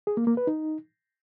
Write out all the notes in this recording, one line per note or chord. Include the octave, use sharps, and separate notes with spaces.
G#4
A#3
A#3
B4
D#4